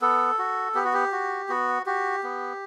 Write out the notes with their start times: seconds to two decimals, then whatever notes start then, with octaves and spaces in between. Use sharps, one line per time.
0.02 B3 A4
0.39 F#4
0.75 B3 G4
0.85 F#4
0.93 G4
1.12 F#4
1.49 B3 F#4
1.86 F#4 G4
2.23 B3